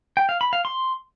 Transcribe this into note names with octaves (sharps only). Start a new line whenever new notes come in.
G5
F5
B5
F5
C6